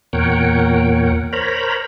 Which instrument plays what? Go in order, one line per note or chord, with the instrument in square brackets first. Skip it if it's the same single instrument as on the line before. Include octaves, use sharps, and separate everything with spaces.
[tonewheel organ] E2 A#2 A#4 C#5 F#5 G5
A#4 C5 C#5 A#5 B5